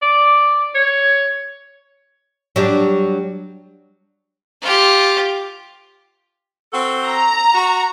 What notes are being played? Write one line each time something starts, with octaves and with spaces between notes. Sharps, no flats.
D5
C#5
F#3 G3 D4
F4 G4
C4 F#4 A4
A#5
F#4